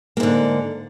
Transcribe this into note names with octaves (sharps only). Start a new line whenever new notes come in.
G#2 D3 A#3